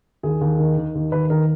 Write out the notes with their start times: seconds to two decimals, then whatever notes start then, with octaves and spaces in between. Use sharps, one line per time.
0.23 D#2 G#4
0.41 D#2
0.59 D#3
0.77 D#3
0.95 D#2
1.12 D#2 B4
1.30 D#3 A#4